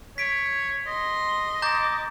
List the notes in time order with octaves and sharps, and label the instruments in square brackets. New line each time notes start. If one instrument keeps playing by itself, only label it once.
[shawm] C#5 [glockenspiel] B6 D7
[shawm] D#5 [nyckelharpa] C6
[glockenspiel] A#5 G6 A6 [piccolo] D6